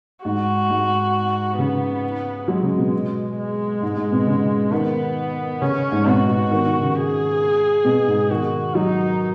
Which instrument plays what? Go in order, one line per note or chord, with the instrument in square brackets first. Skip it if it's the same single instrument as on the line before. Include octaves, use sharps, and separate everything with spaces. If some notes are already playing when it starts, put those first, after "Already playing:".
[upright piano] G#2 [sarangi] F#4
[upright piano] G#2
[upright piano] C#3 [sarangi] B3
[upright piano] F#3 [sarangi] G#3
[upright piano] C#3
B2
[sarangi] G#3
[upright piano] G#2
G#2
B2
C#3
[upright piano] D#3 [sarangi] B3
[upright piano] C#3 [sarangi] C#4
[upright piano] G#2
[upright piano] B2 [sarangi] F#4
[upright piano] B2
D#3
D#3
C#3
[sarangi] G#4
[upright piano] B2
G#2
[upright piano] D#3 [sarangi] F#4
[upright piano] F#3 [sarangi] D#4